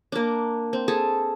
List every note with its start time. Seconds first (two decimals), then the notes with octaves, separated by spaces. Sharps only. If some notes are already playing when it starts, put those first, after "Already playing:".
0.12 A#3 D4
0.73 C4
0.88 G#4 A4